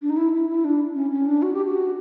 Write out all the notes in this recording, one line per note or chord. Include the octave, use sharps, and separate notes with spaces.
D4
D#4
E4
E4
E4
D4
C#4
C#4
D4
F#4
G4
F#4